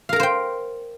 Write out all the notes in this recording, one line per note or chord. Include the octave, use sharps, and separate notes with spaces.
A#4 C5 F5 G5 A#5